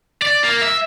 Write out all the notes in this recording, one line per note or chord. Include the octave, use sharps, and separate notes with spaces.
D5
A#3
E5